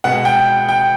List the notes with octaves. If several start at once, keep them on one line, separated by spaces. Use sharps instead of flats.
B2 G#3 B3 F#5
G5
G5